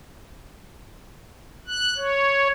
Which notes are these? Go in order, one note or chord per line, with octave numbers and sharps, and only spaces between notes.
F#6
C#5